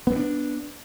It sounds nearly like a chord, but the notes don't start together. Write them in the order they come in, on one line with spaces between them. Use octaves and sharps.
B3 C4 D4